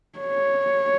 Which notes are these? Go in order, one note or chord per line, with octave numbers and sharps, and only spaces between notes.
C#5